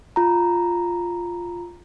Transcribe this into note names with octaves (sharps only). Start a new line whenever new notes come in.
F4 A#5